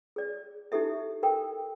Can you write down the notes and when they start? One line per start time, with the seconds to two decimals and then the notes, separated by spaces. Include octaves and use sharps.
0.16 G#4 D5
0.72 D#4 E4 G4 A4 E5
1.23 A4 A#4 G5